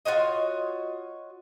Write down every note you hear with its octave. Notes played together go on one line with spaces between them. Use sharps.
F4 F#4 C#5 D#5